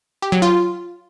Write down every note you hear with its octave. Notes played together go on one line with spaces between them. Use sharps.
G4
F#3
F4